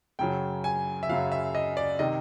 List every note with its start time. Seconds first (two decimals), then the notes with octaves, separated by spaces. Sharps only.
0.19 F#2 C#3 F#3 G5
0.64 G#5
1.03 E5
1.09 F#2 C#3 F#3 F5
1.32 E5
1.55 D#5
1.77 D5
1.99 C3 D#3 D#5